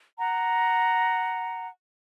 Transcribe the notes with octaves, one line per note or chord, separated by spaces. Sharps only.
F#5 A#5